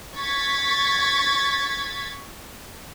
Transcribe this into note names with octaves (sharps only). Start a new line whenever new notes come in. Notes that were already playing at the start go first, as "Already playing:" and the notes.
C#6 G#6 A6 B6